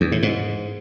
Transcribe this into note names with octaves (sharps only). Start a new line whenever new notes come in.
E2
A2
G#2